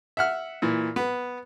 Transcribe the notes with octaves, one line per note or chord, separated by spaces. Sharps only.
E5 F#5 F6
A#2 E3
B3